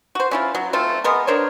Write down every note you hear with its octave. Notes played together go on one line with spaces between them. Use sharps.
F#4 C5
C#4 E4 F4
F#3
A3 C4 F4
G#3 B3 A#4
D4 A#4 C5 C#5